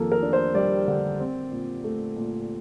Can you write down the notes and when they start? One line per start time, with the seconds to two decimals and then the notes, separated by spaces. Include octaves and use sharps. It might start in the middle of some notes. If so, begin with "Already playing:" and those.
Already playing: F2 D#3 A#3 A4
0.12 A#4
0.22 D4
0.33 C5
0.55 G3 D5
0.88 D3
1.19 C4
1.51 A#2
1.84 A3
2.16 A#2